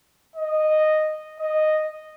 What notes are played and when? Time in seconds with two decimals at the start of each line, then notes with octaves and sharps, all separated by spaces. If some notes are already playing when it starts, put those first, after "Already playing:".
0.36 D#5
1.39 D#5